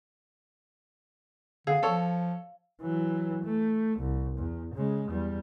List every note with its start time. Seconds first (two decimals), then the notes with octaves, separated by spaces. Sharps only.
1.67 D3 G#4 F5
1.83 F3 A4 C#5
2.82 E3 F#3
3.44 A3
3.99 C2
4.38 E2
4.74 C#3 G#3
5.10 E2 G3